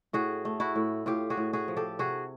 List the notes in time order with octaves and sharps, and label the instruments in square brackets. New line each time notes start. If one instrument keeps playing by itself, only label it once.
[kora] A2 F#4 G#4
A3
E4 F#4
A2
A2 F4 G4
F#4 G#4
A2
F#4 G#4
F3
G4 A4
C3 F#4 G#4